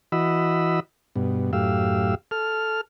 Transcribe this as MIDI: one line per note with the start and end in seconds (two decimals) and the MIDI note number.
0.12 0.80 52
0.12 0.80 66
0.12 0.80 75
0.12 0.80 83
0.12 0.80 88
1.16 1.52 43
1.16 1.52 47
1.53 2.15 42
1.53 2.15 45
1.53 2.15 67
1.53 2.15 77
1.53 2.15 88
2.31 2.81 69
2.31 2.81 89